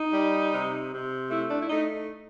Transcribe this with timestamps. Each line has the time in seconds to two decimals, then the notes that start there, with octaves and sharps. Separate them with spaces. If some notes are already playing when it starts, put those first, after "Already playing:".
Already playing: D#4
0.13 G3
0.52 C3
0.92 C3
1.29 A3 E4
1.49 D4
1.59 E4
1.69 A3 D#4